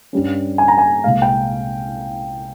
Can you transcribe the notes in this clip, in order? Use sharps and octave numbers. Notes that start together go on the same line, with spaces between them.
G2 G3 C#4
G#5
A#5
G#5
C2 A#2 G#3 F5
G5